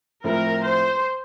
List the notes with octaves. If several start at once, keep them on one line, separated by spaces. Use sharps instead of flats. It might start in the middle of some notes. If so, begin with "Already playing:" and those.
A2 F3 A3 C4 A#4
C5